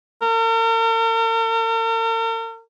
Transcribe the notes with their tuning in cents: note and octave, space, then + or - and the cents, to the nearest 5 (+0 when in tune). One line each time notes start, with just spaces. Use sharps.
A#4 -45